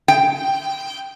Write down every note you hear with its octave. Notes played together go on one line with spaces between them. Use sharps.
G5